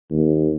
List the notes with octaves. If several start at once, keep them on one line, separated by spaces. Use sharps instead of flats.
D#2